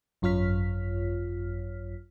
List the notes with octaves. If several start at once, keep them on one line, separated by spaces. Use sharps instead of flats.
G#1 F#2 F4 C#5 F6 B6